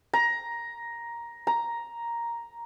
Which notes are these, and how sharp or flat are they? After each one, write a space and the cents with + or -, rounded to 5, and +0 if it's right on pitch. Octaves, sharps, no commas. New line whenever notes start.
A#5 +10
A#5 +5